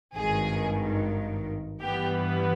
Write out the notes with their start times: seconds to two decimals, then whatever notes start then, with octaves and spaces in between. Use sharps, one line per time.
0.16 G#1 G2 D#3 G#4
1.81 G2 E3 G3 B3 G4